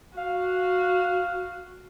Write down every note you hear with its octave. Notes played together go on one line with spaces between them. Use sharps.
F#4 F5